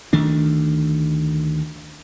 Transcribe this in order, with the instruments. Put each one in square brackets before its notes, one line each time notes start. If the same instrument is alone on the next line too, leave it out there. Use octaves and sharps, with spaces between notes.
[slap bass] D2 D#3 A3 D4